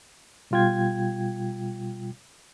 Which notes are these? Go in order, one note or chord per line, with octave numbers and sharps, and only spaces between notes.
B2 G3 F4 G5 G#6